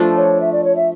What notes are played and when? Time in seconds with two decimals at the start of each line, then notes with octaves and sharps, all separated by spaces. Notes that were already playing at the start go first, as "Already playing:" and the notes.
Already playing: F3 A3 D4
0.16 C#5
0.40 E5
0.52 D5
0.64 C#5
0.75 E5